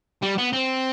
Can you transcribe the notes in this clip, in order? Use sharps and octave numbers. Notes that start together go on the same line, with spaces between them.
G3
B3
C4